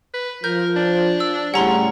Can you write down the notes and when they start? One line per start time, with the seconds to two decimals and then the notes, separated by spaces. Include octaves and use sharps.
0.14 B4
0.44 F3 A#4 G6
0.76 D4
1.20 E6
1.54 A2 C#3 G3 C#4 F#5 A#5 C6